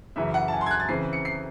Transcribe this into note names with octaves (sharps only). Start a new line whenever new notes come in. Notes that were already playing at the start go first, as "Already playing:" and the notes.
F#2 C#3 E3 E5
F#5
A5
G#5
C6
G#6
F#6
A6
C#3 E3 C4 C7
C#7
C7